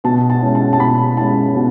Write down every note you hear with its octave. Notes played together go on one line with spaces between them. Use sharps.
B2 A5
A5
G#3 C#4 E4
A5
A5
B2 B5
G#3 C#4 E4 A5
B2